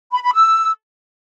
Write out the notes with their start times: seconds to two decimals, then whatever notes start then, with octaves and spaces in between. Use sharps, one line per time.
0.12 B5
0.23 B5
0.33 E6